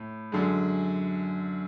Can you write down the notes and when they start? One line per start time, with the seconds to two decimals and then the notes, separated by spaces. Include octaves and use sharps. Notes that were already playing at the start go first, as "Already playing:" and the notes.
Already playing: A2
0.32 F#2 D3 G#3